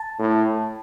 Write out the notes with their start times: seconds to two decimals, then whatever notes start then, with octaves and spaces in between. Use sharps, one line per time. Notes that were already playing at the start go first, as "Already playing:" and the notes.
Already playing: A5
0.19 A2